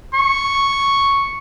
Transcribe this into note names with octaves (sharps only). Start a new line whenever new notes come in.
C#6